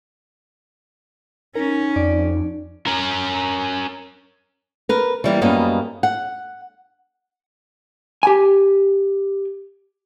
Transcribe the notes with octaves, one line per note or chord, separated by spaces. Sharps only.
C#4 D#4 A#4
F2 D5
C#4 A#4
A#4 B4
E3 G3 A#3
F#2 G3 A#3 B3 D#5
F#5
G4 G#5